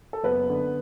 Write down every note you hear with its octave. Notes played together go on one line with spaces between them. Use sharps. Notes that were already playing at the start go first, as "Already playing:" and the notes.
A4
F#1 B3 B4
D3